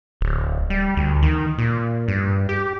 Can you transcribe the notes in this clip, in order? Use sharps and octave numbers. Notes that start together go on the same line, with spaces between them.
D1
G3
D2
D#3
A#2
G2
G4